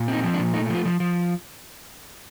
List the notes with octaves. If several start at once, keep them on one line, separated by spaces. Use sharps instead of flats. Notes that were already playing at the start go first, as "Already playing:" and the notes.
Already playing: A#2
C4
D#4
F3
D4
A#2
A3 D#4
F3
F4
F3
F3